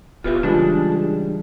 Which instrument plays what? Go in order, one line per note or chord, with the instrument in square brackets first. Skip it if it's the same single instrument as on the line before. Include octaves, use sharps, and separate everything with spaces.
[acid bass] D1 [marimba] B3 G4 [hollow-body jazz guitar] F4 B4 E5
[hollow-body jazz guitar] C#3 G3 G#3 [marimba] E3 F4 A6 [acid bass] D4
[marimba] G#4